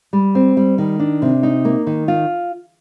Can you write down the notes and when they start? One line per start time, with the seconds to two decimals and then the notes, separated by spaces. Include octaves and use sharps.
0.13 G3
0.35 C4
0.57 G3
0.78 D#3
1.00 D4
1.22 C3
1.43 D#4
1.65 A#3
1.87 D#3
2.08 F4